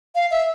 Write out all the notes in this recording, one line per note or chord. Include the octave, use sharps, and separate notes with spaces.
F5
E5